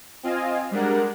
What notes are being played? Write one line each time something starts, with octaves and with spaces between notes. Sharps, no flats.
C4 F4 D#5 F5 G#5
G3 G#3 D4 A#4 F#5